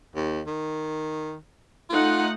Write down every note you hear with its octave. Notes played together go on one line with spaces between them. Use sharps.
D#2
D#3
A3 D#4 F4 F#5